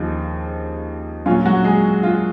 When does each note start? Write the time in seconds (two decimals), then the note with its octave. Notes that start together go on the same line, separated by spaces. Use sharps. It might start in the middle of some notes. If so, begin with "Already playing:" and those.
Already playing: D#2 C#3 F3 D#4
1.26 A#2 F#3 C#4 F4
1.45 F#3 F#4
1.64 G#3 G#4
2.03 F4